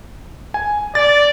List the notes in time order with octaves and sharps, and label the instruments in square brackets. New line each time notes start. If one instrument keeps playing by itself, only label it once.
[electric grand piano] G#5
[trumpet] D5 [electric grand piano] A6